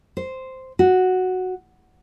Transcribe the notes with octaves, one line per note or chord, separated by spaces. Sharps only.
C5
F#4